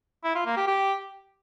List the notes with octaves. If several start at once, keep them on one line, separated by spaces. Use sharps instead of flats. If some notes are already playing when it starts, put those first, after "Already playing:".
E4
F4
A#3
G4
G4